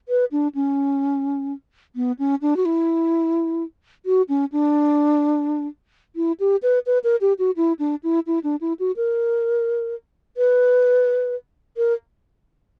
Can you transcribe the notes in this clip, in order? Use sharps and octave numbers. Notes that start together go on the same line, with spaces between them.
B4
D4
C#4
B3
C#4
D4
F#4
E4
F#4
C#4
D4
E4
G4
B4
B4
A#4
G4
F#4
E4
D4
E4
E4
D4
E4
F#4
A#4
B4
A#4